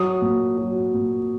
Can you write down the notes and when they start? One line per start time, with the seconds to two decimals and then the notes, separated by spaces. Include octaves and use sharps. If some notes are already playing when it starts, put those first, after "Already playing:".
Already playing: F#3 D#6
0.22 A#2
0.58 F#3
0.94 A#2